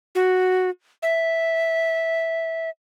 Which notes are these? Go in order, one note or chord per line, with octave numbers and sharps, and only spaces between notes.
F#4
E5